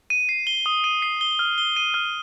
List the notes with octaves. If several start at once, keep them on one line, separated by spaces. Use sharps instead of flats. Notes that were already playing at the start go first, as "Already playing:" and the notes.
D#7
C7
G7
D#6
D#7
C7
G7
F6
G7
D#7
F6